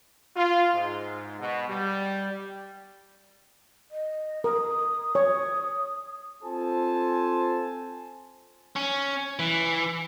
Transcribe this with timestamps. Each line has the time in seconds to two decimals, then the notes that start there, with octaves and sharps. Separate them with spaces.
0.36 F4
0.73 G#2
1.39 B2
1.68 G3
3.91 D#5
4.44 A#4 D#6
5.15 C#5
6.43 C4 F4 A4 C5 G#5 A5
8.76 C#4
9.39 E3